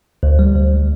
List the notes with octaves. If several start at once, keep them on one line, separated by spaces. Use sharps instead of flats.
D2
G3
D2